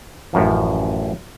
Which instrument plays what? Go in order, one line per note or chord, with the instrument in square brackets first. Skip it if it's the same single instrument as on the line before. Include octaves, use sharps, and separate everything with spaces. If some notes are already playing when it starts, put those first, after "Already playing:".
[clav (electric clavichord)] A1 F#2 F3